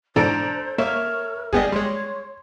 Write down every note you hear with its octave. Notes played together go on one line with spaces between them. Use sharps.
G#2 B2 E3 D4 A4 C5 A#5 D7
A#3 A#4 C#5 E5
G1 G3 B3 G4 G#4 D#5
G3 G#3 C#5 C6